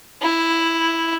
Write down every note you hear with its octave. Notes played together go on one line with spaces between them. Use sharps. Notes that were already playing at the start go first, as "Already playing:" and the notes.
E4